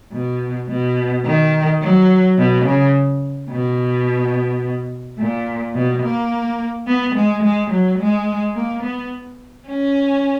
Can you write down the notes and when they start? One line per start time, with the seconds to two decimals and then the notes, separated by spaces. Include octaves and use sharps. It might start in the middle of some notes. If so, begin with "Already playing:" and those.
0.12 B2
0.69 B2
1.25 D#3
1.81 F#3
2.38 B2
2.65 C#3
3.50 B2
5.19 A#2
5.75 B2
6.02 A#3
6.87 B3
7.15 G#3
7.43 G#3
7.71 F#3
7.98 G#3
8.55 A#3
8.83 B3
9.68 C#4